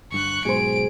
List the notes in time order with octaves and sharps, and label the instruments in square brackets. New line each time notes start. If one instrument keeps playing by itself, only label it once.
[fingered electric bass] G1 G2 [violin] C#6 F#6
[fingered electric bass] B1 G#2 B2 [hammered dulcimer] G#4 C5 [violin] D7